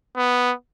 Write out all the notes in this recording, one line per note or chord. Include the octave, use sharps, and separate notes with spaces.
B3